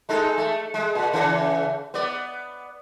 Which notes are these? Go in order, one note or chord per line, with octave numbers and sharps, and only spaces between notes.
G#3 D#4 A4
A3
G#3
A#2
C#3 E3
B3 D5